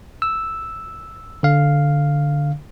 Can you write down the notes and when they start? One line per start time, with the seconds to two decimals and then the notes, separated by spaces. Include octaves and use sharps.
0.22 E6
1.43 D3 F5